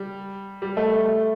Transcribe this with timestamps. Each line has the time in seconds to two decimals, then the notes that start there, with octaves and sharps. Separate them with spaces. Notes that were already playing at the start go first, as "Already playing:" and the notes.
Already playing: G3
0.62 G3
0.77 A3
1.06 A3